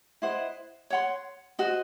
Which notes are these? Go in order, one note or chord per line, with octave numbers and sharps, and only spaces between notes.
E4 C5 D#5 F#5
C#5 F#5 C6
F#4 C5 D#5